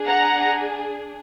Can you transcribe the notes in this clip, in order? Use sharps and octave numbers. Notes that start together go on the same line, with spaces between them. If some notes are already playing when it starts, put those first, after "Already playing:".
Already playing: D4 G#4
F#5 A#5